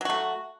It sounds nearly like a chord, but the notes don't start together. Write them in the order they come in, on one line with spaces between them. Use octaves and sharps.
F#3 F#4 A3